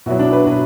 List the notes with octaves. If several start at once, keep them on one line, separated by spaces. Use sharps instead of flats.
B2 F#3 E4
D4
B4
B2 F#3